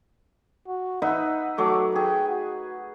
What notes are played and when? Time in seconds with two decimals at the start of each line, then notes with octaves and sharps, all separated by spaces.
0.67 F#4
1.02 D#4 B4 E5 F#5
1.58 F#3 A3 D6
1.96 G#4 G5
2.28 F#4